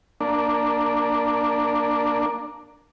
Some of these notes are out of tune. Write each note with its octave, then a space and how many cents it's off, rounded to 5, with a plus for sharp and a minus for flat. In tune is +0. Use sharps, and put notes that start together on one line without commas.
A#3 +0 D4 +0